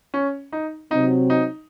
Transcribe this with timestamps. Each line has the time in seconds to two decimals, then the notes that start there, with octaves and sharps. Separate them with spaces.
0.14 C#4
0.52 D#4
0.91 C3 F#3 C4 D#4
1.30 D#4